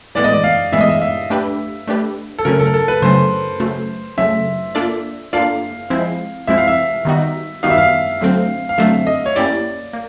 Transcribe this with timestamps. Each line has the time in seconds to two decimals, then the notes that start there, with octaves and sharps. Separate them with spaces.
0.15 A2 E3 G#3 B3 D5
0.24 D#5
0.33 D5
0.44 F5
0.72 A2 E3 G#3 B3 E5
0.81 D#5
0.89 E5
1.02 E5
1.30 A3 D4 G4 B4
1.87 A3 D4 G4 B4
2.39 A4
2.45 C#3 F#3 A3 C#4 A#4
2.60 A4
2.66 A#4
2.74 A4
2.88 B4
3.02 C#3 F#3 A3 C#4 C5
3.60 C#3 F#3 A3
4.18 C#3 F#3 A3 E5
4.75 A#3 D4 F4 A4 D5
5.33 A#3 D4 F4 A4 D5 F5
5.90 F3 G#3 C4 E4
6.47 F3 G#3 C4 E4 E5
6.58 F5
6.68 E5
7.05 D#3 G3 B3 D#4 F#4
7.63 D#3 G3 B3 D#4 F#4 F5
7.70 E5
7.78 F5
8.21 D3 F#3 A3 C4
8.69 F5
8.78 D3 F#3 A3 C4 E5
9.07 D#5
9.26 C#5
9.36 A#3 C#4 E4 G4 D5
9.93 A#3